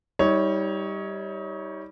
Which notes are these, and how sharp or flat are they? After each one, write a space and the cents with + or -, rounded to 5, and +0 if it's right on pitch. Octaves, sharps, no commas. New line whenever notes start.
G3 +0 D#4 +35 C#5 +0